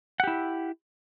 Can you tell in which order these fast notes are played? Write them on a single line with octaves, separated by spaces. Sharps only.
F#5 G4 E4